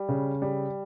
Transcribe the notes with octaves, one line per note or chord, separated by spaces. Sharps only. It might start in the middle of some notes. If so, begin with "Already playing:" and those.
Already playing: G3
C#3
G3